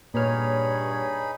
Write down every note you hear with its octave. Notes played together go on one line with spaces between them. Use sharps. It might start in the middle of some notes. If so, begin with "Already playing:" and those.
G2 A#2 D#4 G#4 C#5 B5 F6